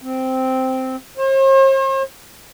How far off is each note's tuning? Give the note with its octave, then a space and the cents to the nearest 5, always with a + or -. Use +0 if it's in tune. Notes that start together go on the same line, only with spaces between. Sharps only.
C4 -5
C5 +45